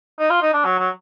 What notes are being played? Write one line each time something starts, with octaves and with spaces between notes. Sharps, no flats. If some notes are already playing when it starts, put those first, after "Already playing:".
D#4
F4
D#4
D4
F#3
F#3